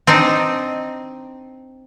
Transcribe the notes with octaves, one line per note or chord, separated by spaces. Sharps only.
C4 D4 D#4 D5